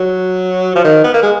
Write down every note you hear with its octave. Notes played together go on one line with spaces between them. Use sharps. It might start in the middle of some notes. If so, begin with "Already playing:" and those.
Already playing: F#3
F3
D#3
B3
A#3
G#3